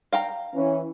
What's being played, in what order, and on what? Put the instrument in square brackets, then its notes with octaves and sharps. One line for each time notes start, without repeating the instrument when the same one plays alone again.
[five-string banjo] F5 G5 A#5
[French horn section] E3 C#4